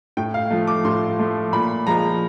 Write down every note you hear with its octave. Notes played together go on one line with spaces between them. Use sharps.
A2 G5
F5
F3 A3
D6
A2 C6
F3 A3
A#2 B5
F3 G#3 A#5